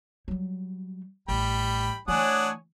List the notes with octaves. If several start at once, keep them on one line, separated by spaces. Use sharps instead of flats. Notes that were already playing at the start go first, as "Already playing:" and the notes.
F#3 G3
A1 G3 G5 B5
E3 A3 D4 C#5 F#5 G#5 D#6